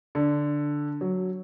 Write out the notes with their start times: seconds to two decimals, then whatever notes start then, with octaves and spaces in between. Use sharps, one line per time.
0.15 D3
1.01 F#3